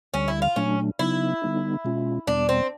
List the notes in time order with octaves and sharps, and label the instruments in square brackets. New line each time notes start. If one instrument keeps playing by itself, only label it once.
[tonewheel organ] D2 D3 G3 [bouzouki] C#4
[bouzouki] E4
F4
[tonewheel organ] A#2 F#3 A3 D4 [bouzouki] C#4
[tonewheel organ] C#3 F#3 B3 D#4 [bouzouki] E4
[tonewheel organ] D3 G3 B3 D#4
B2 G#3 C#4 F4
[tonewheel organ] E2 B2 G3 B3 [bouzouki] D4
[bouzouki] C4